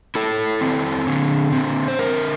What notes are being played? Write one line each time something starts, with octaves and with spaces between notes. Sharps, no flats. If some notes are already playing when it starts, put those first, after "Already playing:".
E4 A4
C4
D3
C4
C5
D3 A#4